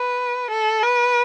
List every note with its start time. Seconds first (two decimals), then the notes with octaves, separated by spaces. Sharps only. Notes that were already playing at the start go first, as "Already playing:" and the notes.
Already playing: B4
0.50 A4
0.83 B4